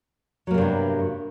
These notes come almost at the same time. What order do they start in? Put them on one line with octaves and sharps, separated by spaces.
F#3 A#3 C3 G2 B3